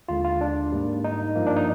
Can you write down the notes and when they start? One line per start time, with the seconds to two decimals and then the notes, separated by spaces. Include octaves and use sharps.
0.08 D#2 D3 G#3 F4
0.25 F4
0.41 D4
0.72 G#2 G3 A#3
1.04 D#4
1.35 G2 F3 A#3
1.46 D4
1.57 D#4